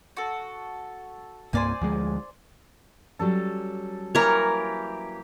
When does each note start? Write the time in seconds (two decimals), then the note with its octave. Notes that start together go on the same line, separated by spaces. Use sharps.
0.17 F#4 A4
1.53 C2 G2 A#3 C5 D5 G#5
1.81 D2 F3 G#3
3.19 F#3 G3 C#4 A4
4.15 E3 A#3 G4 A#4 C#5